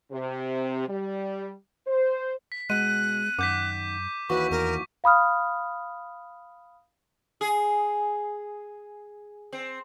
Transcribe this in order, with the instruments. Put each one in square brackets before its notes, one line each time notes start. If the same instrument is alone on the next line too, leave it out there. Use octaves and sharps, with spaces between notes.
[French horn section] C3
G3
C5
[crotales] B6
[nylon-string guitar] B2 [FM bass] G#3 [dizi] F#6 [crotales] D#7
[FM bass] F#2 [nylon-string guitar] D#3 F#5 [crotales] D6 G6 B6
[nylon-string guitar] D#2 E3 F#4 [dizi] B4 [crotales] C#6
[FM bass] E2 [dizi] A#4
[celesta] F5 B5 D#6 F6
[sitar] G#4
C4